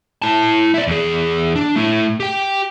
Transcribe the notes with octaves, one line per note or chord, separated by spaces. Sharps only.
E4 A5
E4 D5
E2 G#4
D4
A3 E4
G4 G5